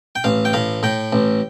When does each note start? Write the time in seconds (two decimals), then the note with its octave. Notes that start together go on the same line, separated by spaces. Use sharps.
0.15 G5
0.24 A1 F5
0.45 G5
0.53 A2 F5
0.83 A2 G5
1.13 A1